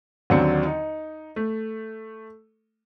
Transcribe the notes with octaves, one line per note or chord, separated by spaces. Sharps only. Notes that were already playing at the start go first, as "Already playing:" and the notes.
D#2 D3 F#3 C4 D4 C#7
D#4
A3